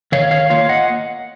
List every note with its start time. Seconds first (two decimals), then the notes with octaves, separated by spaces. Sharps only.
0.12 D#3 C#5 F5
0.31 C#5 F5
0.50 A#3 F4 C#5 F5
0.69 D#5 F#5